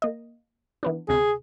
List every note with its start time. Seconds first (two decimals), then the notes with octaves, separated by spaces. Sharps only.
0.02 A#3 D#5
0.83 E3 B3 D4
1.09 D2 C3 G#4